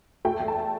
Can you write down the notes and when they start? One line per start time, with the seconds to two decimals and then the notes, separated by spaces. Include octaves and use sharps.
0.25 A3 G5
0.40 E2
0.48 A5